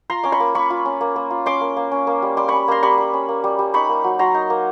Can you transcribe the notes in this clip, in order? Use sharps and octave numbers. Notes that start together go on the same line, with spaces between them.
F4 A#5 C6
C#4 D6
B5 C#6
A#3
A#3 B5 C#6
F4
C#4
A#3
A#3
F4
C#4 C6 D6
A#3
A#3
C#4
A#3
G3
G3 C6 D6
C#4 B5 C#6
A#3 A#5 C6
G3 B5 C#6
G3
C#4
A#3
G3
G3
D#4 B5 C#6
A#3
F#3
F#3 A#5 C6
D#4
A#3